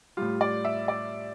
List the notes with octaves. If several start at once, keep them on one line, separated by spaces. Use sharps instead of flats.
A2 G3 F4
D5
E5
D5